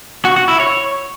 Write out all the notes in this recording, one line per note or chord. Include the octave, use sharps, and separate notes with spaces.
F#4
F#4
E4
C#5